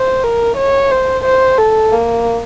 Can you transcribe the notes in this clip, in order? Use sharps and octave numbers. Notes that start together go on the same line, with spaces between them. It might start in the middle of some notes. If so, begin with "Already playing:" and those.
Already playing: C5
A#4
C#5
C5
C5
A4
A#3